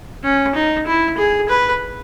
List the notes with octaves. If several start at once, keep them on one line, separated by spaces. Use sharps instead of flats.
C#4
D#4
E4
G#4
B4